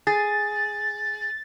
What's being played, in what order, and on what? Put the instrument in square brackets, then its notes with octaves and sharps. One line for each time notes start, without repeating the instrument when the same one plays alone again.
[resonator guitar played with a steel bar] G#4 [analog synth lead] A6